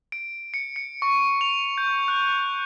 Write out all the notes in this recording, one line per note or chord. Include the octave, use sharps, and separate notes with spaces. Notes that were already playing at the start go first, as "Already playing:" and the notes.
D7
C#7
C#7
C#6
F7
G6
F#6